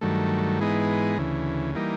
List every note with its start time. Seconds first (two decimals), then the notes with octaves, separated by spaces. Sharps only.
0.01 G2 D#3 F#3 A3
0.60 G#2 E3 G#3 B3 D#4
1.18 D2 C#3 E3
1.75 E3 G3 A#3 D#4